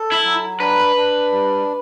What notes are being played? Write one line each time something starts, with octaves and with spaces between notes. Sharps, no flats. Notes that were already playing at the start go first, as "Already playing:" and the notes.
Already playing: A4
E4
F#3
D4 B4
D4
G3